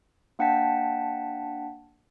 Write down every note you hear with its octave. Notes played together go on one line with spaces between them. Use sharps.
A#3 D4 F#5 G5 A5 B6